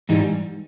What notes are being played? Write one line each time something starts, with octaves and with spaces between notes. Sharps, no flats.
G#2 E3 G3 D#4